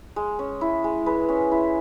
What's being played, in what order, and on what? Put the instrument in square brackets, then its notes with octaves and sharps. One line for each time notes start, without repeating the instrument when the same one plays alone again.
[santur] G#3
C#4
E4
G#3
G#3 B4
C#4
E4